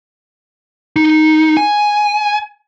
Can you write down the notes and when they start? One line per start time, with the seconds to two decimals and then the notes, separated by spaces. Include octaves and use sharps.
0.96 D#4
1.57 G#5